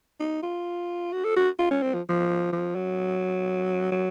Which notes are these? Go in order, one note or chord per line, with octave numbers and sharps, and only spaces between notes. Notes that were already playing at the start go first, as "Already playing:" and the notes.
D#4
F4
F#4
A4
F#4
F4
C#4
C4
F3
F3
F3
F#3
F#3